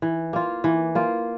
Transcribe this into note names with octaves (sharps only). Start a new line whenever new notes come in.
E3
A#3 F4
E3
A#3 F4